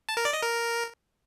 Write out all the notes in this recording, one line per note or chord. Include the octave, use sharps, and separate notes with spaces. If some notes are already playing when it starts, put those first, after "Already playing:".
A5
A#4
D5
D#5
A#4